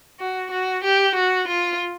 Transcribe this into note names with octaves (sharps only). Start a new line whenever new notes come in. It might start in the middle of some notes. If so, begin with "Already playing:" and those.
F#4
F#4
G4
F#4
F4